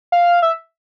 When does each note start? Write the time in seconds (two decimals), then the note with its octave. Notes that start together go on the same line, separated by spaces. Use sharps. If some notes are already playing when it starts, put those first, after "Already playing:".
0.12 F5
0.42 E5